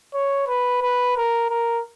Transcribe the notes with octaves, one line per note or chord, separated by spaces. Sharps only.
C#5
B4
B4
A#4
A#4